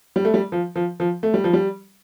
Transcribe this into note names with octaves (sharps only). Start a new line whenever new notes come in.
G3
A3
G3
F3
F3
F3
A3
G3
F3
G3